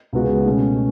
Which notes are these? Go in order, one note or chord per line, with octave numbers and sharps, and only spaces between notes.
C#2 C#3 G#3 B3 F#4
B2 A3 C#4